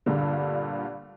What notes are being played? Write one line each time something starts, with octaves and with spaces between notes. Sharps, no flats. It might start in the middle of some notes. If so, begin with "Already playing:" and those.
G2 A#2 D3